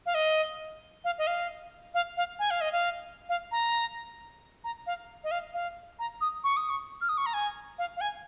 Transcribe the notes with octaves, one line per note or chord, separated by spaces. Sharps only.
F5
D#5
F5
D#5
F5
F5
F5
G#5
F5
D#5
F5
F5
A#5
A#5
F5
D#5
F5
F5
A#5
D#6
C#6
D#6
C#6
F6
D#6
C#6
A#5
G#5
F5
F5
G#5